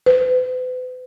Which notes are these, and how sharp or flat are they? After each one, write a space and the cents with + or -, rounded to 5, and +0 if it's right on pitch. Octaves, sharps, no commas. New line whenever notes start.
B4 +40